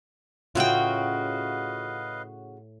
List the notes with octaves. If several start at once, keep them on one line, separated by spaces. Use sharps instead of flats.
A2 C#3 F4 F#4 B4 D#5 F5 G5